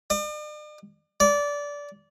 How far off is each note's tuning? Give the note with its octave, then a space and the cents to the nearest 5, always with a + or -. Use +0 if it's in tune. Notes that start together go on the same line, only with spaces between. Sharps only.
D5 +45
D5 -20